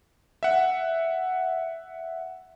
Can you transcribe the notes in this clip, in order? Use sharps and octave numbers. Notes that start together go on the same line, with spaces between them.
E5 F#5